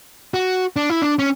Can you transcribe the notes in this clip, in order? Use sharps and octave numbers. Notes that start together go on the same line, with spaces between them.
F#4
D4
E4
D4
C#4